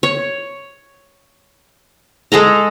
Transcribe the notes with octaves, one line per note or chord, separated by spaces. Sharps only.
C#5
G#3 G#4 A4 A#5